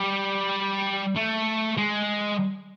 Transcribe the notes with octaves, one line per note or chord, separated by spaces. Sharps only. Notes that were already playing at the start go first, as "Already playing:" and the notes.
Already playing: G3
A3
G#3